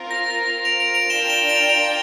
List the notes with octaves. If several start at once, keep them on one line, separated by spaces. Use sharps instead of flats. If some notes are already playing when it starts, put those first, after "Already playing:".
Already playing: C4 F4 A#4
A#6
A#6
A#6
D7 F7
D7 F7
D7 F7
D4 F4 A#4 D5 G5 E7 G7
E7 G7
D7 F7
D7 F7